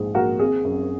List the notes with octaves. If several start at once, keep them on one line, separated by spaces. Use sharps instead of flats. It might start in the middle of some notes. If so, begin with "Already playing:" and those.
Already playing: A#1 G#2 G#4
A#1 F#4 A#4
G#1 G#4
F#2